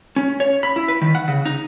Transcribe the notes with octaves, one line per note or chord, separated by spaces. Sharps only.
C#4
C#5
B5
E4
B4
D#3
F#5
C#3
D#4